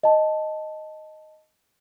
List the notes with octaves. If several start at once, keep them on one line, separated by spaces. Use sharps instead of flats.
D#5 A5